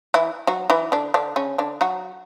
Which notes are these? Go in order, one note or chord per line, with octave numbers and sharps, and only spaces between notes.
E3 E4
F#3 F#4
E3 E4
D3 D4
D3 D4
C#3 C#4
D3 D4
F#3 F#4